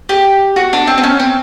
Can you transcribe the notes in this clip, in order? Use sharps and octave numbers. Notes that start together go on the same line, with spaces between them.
G4
F#4
D4
C4
C4
C#4
C4